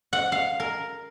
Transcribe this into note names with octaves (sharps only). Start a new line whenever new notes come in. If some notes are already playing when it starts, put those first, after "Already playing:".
F#5
F5
A#4